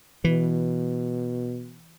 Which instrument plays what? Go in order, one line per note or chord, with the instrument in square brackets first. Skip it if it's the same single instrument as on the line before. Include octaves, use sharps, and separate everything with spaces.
[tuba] B2 [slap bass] E3